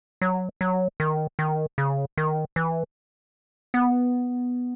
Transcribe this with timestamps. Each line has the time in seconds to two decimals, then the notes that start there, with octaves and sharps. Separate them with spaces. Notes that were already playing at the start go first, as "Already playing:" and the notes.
0.21 F#3
0.61 F#3
1.00 D#3
1.39 D#3
1.78 C#3
2.17 D#3
2.56 E3
3.74 B3